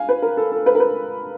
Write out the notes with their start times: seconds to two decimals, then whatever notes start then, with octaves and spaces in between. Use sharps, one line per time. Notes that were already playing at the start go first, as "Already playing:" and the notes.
Already playing: F5 G#5
0.09 B4
0.22 A#4
0.37 A4
0.52 A4
0.66 B4
0.75 A#4
0.80 B4